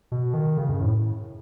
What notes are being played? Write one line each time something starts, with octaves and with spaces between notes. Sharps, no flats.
B2
D#3
C#3
F#2
A2